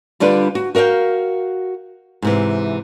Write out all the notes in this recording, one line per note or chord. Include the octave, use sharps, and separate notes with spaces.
D3 G3 D4 F4 B4
F#4
F#4 A#4 E5 F5 G5
G#2 C3 E3